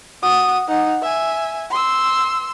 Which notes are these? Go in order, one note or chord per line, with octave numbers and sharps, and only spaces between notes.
F#4 D#6
D#4 F#5
E5 G#5
C6 E6